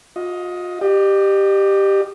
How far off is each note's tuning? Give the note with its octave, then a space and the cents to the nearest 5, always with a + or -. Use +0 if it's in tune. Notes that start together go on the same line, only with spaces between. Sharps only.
F4 +40 D#5 +15
G4 +0 D#5 -45